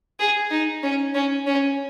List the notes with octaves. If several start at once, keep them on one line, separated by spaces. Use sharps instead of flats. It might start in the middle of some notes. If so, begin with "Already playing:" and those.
G#4
D#4
C#4
C#4
C#4